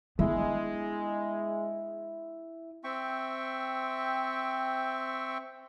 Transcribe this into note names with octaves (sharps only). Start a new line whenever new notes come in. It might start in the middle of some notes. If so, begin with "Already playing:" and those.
G#3 B3 D4 E4
C4 E5 G5 C#6